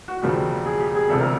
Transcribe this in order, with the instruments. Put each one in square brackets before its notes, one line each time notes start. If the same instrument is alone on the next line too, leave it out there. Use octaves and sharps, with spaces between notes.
[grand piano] F#4
E1 D#2 C#3 F3 G4
G#4
G4
G#4
E1 D2 C3 F3 A4
A#4